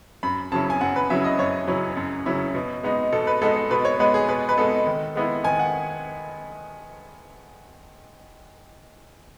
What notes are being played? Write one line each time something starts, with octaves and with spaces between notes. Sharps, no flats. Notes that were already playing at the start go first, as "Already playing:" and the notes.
F#2 B5
C#3 F#3 C#4 E4 A5
G#5
F#2 F#5
B4
C#3 F#3 C#4 E4 E5
D#5
F#2 C#5
C#3 F#3 C#4 E4
F#2
C#3 F#3 C#4 E4
B2
G#3 B3 D#4
B2 A4
B4
G#3 B3 D#4 A4
A4
B2 B4
C#5
G#3 B3 D#4 B4
G#4
B2 B4
B4
G#3 B3 D#4 A4
D#3
G#3 B3 E4
D#3 G#5
F#5